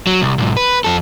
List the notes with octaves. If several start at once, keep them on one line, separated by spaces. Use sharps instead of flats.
F#3
C2
B1 G#2
B4
F2 A4